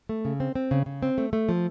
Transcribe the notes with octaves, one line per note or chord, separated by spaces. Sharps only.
A3
C#3
C4
C4
C#3
C#3
C4
A3
A3
F3